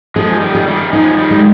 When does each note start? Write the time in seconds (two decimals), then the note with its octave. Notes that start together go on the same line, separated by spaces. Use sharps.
0.16 F3 G#3 G#4
0.41 D#3 G3
0.55 G#4
0.67 D#3 G3
0.92 F3 G#3 D#4
1.18 D#3 G3
1.31 G#3